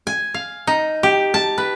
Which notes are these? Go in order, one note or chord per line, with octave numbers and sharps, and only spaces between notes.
G#5
F5
D#4
G4
A5
B4